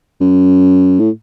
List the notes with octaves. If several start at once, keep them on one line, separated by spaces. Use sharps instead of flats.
F#2
A2